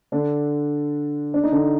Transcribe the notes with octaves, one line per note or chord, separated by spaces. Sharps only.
D3 D4
D4
D#4
D3 D4